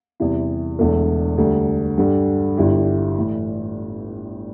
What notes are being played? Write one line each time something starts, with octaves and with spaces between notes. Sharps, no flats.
E2 C3 E3 G3 E4
E1 E2 D3 A3
D2 D3 G3
G2 D3 G3
G1 G2 G3 E4 G4
A2 E3